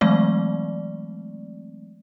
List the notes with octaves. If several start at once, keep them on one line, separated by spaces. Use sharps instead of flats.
E3 F#3 G#3 A3 C4 D5